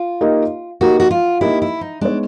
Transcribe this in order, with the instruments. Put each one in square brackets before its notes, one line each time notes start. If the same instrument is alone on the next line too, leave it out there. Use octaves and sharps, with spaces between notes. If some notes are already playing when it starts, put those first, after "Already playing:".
Already playing: [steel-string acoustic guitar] F4
[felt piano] A#3 D#4 G4 A#4 D#5
[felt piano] A#3 D#4 G4 A#4 D#5 [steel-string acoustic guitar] F#4
[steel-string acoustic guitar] F#4
F4
[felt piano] A#3 D#4 G4 A#4 D#5 [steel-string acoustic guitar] E4
[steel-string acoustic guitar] E4
D#4
[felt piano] G#3 B3 D#4 G#4 C#5 [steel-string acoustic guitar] D4